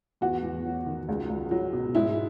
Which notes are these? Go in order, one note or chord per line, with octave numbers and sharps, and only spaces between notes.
E2 F#4
E2
F#3
D#3
C#2
C#2
F#3
B2
G#2 E4